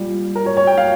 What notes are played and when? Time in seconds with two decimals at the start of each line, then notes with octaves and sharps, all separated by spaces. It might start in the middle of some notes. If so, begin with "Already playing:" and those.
Already playing: A#2 G3
0.35 A#4
0.46 C#5
0.57 C#5
0.67 G5
0.78 F5